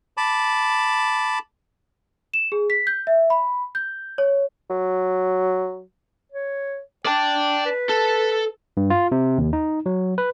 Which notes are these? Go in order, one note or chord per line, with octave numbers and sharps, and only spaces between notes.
A5 B5 D6
E7
G#4
B6
G6
E5
B5
G6
C#5
F#3
C#5
D5 G5 A5
B4
A4
G2
F4
C3
D#2
D#4
F#3
B4